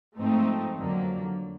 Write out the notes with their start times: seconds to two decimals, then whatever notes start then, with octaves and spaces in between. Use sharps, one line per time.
0.16 G#2 F3 A3 C4 D#4
0.75 F2 D3 F#3 A#3